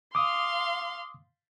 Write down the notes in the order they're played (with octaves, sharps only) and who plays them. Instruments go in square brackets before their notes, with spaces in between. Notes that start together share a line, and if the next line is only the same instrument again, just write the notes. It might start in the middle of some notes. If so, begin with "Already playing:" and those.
[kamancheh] F5 C6 [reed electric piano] D6 D#6